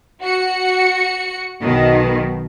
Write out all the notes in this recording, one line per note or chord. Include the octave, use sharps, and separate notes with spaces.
F#4 C#7
B1 B2 D#3